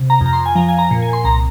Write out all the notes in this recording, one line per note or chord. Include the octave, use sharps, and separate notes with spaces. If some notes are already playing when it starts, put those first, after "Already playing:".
Already playing: C3
A#5
F2 A#5
C6
G#5
F3 A#5
G#5
A#5
A#2
G#5
C6
C2 A#5